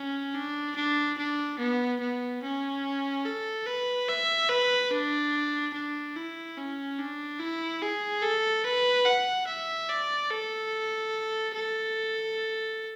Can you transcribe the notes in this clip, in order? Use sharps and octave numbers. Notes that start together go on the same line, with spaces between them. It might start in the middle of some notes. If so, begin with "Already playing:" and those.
Already playing: C#4
D4
D4
D4
B3
B3
C#4
A4
B4
E5
B4
D4
D4
E4
C#4
D4
E4
G#4
A4
B4
F#5
E5
D5
A4
A4